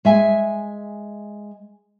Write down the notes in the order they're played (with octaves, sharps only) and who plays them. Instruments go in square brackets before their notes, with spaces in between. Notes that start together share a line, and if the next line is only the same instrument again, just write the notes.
[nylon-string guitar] G#3 E5 G#5